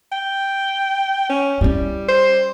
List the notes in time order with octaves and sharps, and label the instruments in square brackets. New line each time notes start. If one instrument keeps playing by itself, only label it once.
[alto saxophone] G5
C#4
[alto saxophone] G3 [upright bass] C#4 E4
[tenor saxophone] C5